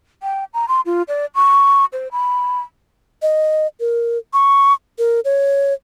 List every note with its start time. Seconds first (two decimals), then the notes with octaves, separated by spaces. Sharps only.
0.23 G5
0.54 A#5
0.68 C6
0.86 F4
1.08 D5
1.35 C#6
1.93 C5
2.12 B5
3.22 D#5
3.80 A#4
4.34 C#6
4.98 A#4
5.25 C#5